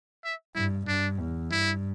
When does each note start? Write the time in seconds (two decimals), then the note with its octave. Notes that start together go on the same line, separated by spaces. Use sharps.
0.24 E5
0.55 G2 E4
0.88 G2 D4
1.19 E2
1.51 G2 E4